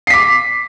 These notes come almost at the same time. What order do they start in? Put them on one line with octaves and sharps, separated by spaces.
C7 B6 D6